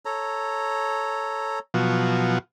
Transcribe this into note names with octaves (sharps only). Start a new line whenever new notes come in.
A4 C#5 A#5
B2 F3 F#3